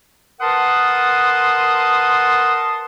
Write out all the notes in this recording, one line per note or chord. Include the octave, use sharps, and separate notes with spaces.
A#4 B4 F#5 A5 C6 D#6